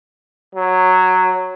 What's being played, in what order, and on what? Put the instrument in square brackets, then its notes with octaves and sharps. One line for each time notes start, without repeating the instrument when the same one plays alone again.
[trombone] F#3